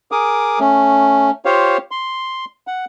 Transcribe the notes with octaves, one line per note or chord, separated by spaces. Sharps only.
G#4 A#4 D6 D#6
A3 C#4
F4 G4 C5 C#5 F5
C6
F#5